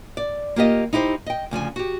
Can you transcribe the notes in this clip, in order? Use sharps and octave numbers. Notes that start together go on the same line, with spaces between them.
D5
A#3 F4 G4 D#5
D#4 E4 G4 A#4 C5
D#5 G5
D2 C#3 F3 G#5
F#4 G4